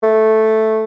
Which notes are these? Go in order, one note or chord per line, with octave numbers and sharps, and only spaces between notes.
A3